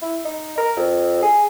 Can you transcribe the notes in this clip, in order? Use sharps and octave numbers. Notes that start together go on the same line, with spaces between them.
E4
D#4
A#4
F2
G#4